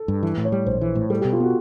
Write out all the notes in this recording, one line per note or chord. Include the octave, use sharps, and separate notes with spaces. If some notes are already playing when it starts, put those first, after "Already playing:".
Already playing: A4
G2
E3
A2
C#5
G3
A#1 C5
E3
A2
G3 A4
B2 G4
F4
B3 F#4